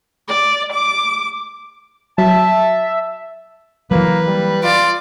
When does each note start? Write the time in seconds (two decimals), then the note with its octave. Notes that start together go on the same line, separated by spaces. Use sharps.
0.28 D5
0.72 D6
2.18 F#3 E5 A5
3.91 E3 F#3 A#3 B4
4.27 G3
4.63 F4 D5